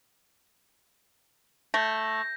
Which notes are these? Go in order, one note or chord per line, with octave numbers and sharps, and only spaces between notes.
A3 G6 A#6